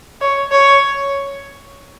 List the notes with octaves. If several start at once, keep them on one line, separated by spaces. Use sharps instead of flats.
C#5
C#5